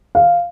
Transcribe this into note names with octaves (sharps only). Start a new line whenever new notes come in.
F5